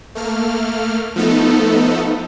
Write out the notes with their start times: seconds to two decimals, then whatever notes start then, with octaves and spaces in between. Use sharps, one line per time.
0.15 A3 A#3 F6
1.16 F3 A3 B3 D#4 A4